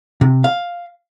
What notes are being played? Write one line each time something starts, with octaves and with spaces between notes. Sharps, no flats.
C3
F5